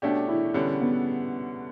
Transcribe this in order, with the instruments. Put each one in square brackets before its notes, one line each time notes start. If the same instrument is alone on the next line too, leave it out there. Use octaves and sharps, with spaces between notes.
[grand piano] B2 A3 C#4 G4 [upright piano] D4
[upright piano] E4
[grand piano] D3 G3 B3 [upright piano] C#4
[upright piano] B3